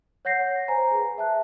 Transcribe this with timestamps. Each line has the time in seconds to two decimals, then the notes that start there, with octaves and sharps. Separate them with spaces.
0.25 C#5 F#5 G6 A#6 C7
0.68 C5 G#5 A#5
0.91 G#4 B4
1.18 E5 A5 F#6